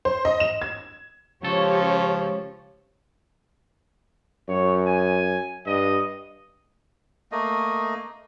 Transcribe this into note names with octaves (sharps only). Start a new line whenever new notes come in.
C5
D#5
E7
G#6
C#2 F3 C#4 G4 A4 C#5
F#2 C#5
G#5
G2 D#5
A3 A#3 D#5